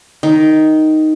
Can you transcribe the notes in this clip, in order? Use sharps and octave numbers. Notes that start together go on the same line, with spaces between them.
D#3